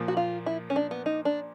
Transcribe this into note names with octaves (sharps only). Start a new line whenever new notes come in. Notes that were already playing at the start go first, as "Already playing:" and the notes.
Already playing: A#2 F3 A#3
F#4
F4
E4
C#4
D4
B3
D#4
D4